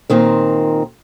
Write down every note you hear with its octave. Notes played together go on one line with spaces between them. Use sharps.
A#2 D#3 C4